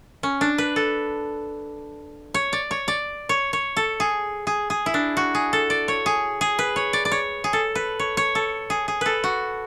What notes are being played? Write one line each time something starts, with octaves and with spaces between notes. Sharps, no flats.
C#4
D4
B4
A4
C#5
D5
C#5
D5
C#5
C#5
A4
G#4
G#4
G#4
E4
D4
F#4
G#4
A4
D5
C#5
G#4
G#4
B4
C#5
D5
D5
C#5
G#4
A4
B4
C#5
C#5
A4
G#4
G#4
A4 B4
F#4